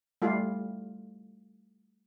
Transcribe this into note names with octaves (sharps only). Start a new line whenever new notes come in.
G3 A3 F4